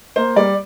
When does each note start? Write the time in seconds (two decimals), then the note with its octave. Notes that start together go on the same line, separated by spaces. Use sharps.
0.16 A#3 C5
0.36 G3 D5